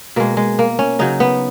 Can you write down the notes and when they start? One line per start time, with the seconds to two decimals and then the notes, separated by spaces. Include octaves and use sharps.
0.16 B2 G#3 A#3
0.37 G#3
0.59 A#3
0.79 C#4
0.99 C#3 F#3 D#4
1.20 B3